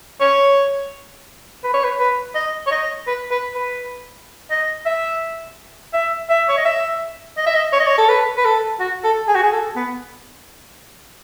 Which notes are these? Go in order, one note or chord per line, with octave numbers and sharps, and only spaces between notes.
C#5
B4
C#5
B4
B4
D#5
C#5
D#5
B4
B4
B4
D#5
E5
E5
E5
C#5
D#5
E5
D#5
E5
D#5
C#5
D#5
C#5
A4
B4
B4
A4
F#4
A4
G#4
F#4
G#4
A4
B3